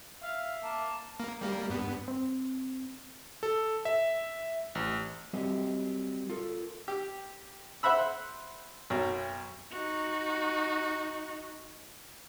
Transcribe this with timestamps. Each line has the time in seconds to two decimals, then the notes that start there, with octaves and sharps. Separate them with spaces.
0.23 E5 F5
0.63 A#3 A5
1.20 A#3
1.41 G3 A#3
1.70 G2 B3
2.08 C4
3.43 A4
3.85 E5
4.75 A1
5.33 F#3 G3 C4 G4 A#4 D#5
6.29 F4 A4 A#4
6.88 G4
7.83 C5 E5 F#5 B5 E6
8.90 B1 F#2
9.72 D#4 F#4